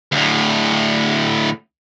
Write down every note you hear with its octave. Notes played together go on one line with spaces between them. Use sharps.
D2 A2